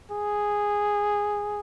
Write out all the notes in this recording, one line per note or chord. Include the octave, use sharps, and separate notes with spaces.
G#4